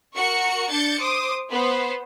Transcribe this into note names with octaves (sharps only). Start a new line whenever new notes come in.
F#4 A#4 C#6 C#7
D4 G6 A6 C#7
C5 D6 D#6
B3 C5